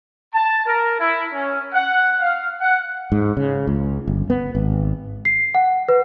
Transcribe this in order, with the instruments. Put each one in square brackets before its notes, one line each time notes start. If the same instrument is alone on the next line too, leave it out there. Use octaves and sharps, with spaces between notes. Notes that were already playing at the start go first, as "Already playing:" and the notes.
[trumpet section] A5
A#4
E4
C#4
F#5
F5
F#5
[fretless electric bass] G#2
C#3
C#2
G1
B3
G#1
[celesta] C7
F#5
B4